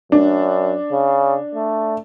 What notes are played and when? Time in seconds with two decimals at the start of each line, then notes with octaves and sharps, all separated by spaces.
0.12 F#2 D4
0.92 C#3
1.55 A3